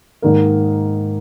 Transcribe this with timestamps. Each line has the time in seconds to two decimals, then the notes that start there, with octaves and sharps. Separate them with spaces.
0.22 G#2 D#3 A#3